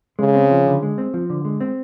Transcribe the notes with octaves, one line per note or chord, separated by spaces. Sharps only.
C#3 G#3
C4
F3
D3
G#3
C4
F3
D3
G#3
C4